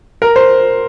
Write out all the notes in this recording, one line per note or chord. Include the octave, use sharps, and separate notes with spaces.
A#4
C5